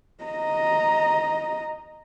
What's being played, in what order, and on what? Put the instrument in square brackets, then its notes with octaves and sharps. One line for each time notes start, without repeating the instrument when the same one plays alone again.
[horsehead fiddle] D#5 A#5